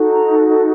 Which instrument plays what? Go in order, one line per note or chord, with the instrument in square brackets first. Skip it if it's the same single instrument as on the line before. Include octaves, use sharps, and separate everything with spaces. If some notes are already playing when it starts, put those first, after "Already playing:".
Already playing: [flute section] D#4 F#4 A4
A#5